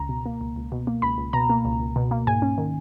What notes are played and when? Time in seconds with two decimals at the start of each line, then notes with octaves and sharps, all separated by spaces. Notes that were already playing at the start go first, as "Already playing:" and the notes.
Already playing: C#2 A#5
0.09 B2
0.26 A#3
0.41 C#2
0.56 C#2
0.72 B2
0.87 A#3
1.02 C#2 B5
1.18 C#2
1.33 B2 A#5
1.50 A#3
1.65 C#2
1.80 C#2
1.96 B2
2.11 A#3
2.27 G#2 G#5
2.42 C#4
2.58 D#3